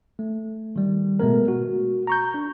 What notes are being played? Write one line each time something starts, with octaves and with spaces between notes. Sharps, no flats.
A3
D#3 G3
B2 G#3 A3 B3 A#4
F#4
A#5 C#6 G6
D4